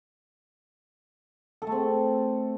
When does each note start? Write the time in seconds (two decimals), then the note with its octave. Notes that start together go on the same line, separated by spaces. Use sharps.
1.62 A4
1.67 A3
1.72 C4